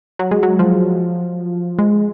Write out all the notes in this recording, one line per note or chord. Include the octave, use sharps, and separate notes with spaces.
F#3
G#3
F#3
F3
G#3